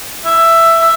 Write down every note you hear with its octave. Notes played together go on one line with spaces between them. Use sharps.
E5
E5